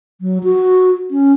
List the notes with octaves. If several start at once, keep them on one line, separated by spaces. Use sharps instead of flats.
F#3
F#4
C#4